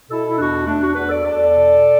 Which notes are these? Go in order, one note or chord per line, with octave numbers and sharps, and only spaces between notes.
B2 E4 A4
E4
E2 D4 F#4
E2 A3 D4
D4 F#4
E2 F#4 B4
A4 D5
E2 A4 D5
B2